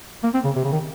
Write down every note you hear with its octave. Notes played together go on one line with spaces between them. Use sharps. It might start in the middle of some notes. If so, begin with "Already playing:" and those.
A#3
C4
C#3
C3
C#3
D#3